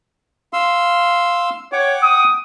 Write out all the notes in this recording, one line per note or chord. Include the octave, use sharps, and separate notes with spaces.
F5 C6 E6
C#5 F#5 G5 D6
D#6